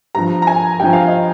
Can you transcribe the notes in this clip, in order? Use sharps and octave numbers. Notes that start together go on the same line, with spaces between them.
G2 F3 A#5
A#5
G#5
G2 F3 G5
F5
D#5